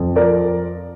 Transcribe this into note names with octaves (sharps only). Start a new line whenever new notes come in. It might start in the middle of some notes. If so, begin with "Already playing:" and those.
Already playing: F2
F3 A#4 D5